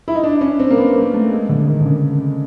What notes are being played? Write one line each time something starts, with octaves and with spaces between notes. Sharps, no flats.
E4
D#4
D4
C#4
C4
A#3
B3
A#3
A3
G#3
D3
D#3
D3
C#3